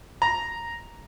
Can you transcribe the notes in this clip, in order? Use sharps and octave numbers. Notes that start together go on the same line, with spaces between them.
A#5